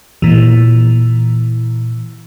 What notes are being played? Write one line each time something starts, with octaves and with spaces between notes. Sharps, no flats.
A#2 E3